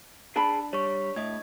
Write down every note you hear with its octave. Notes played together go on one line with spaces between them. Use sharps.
D4 G#4 G5 A5 B5
G3 C#5 C#6
A2 D#5 G#6